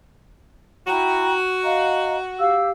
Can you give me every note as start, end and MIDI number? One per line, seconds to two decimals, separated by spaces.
0.87 1.34 64
0.87 2.58 66
0.87 1.34 79
0.87 1.34 82
1.63 2.16 75
1.63 2.16 77
1.63 2.16 82
2.39 2.70 67
2.39 2.70 77
2.39 2.70 88